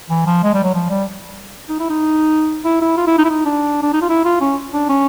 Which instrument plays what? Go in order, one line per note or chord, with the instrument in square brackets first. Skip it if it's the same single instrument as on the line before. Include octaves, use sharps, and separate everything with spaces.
[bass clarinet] E3
F3
G#3
G3
F#3
F3
G3
D#4
E4
D#4
E4
E4
F4
E4
D#4
E4
D#4
D4
D4
D#4
F4
E4
F4
C#4
D4
C#4